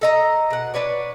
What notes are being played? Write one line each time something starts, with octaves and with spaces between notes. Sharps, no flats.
A4 D#5 A#5
B2 F#5
D4 B4 C#5 D5